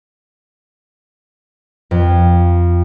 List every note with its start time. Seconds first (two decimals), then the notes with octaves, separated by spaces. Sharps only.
1.91 F2